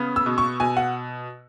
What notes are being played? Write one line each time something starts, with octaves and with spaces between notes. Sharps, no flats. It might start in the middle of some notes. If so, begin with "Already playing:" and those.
Already playing: C#3 B3
E6
B2
C#6
B2 G#5
F#5